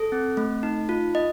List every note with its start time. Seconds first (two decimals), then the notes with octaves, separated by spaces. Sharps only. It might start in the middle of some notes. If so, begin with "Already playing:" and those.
Already playing: A4
0.12 C4
0.37 A3
0.63 D#4
0.89 F4
1.15 D#5